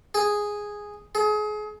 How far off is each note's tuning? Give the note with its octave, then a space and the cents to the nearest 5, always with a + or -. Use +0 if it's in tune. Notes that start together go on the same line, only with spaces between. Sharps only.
G#4 -5
G#4 +30